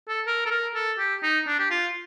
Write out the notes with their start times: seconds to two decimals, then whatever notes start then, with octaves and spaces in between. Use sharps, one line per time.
0.09 A4
0.27 A#4
0.46 A4
0.51 A#4
0.75 A4
0.99 G4
1.23 D#4
1.47 D4
1.59 G4
1.71 F4